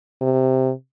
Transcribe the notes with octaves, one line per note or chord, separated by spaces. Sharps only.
C3